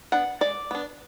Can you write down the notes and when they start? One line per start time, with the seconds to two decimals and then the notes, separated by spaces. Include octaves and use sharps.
0.12 B3 D4 F#5
0.41 G#3 D5
0.71 B3 D4